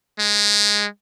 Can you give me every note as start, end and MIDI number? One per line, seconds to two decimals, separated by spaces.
0.19 0.86 56